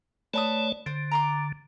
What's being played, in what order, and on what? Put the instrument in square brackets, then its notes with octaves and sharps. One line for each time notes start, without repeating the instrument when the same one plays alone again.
[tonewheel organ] A3 C#5 D5 [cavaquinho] B4 A5 D#6
[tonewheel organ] D3 [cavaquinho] C5
[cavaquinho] A#5 C6 D6